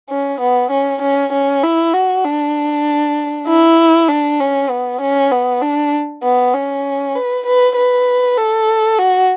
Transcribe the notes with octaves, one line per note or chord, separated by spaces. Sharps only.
C#4
B3
C#4
C#4
C#4
E4
F#4
D4
E4
D4
C#4
B3
C#4
B3
D4
B3
C#4
B4
B4
B4
A4
F#4